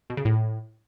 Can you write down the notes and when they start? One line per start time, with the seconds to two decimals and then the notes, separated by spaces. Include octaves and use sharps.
0.10 B2
0.17 C#3
0.25 A2